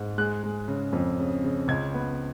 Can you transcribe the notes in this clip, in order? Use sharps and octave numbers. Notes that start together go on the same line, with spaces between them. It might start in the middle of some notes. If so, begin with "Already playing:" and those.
Already playing: G#2
G#3 F#6
G#3
C#3
F2
C#3
C#3
C#2 G#6
B3